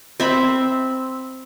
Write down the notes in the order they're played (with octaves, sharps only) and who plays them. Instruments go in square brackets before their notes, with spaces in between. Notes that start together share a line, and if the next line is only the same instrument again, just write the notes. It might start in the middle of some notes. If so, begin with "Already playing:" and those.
[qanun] C4 E5 B5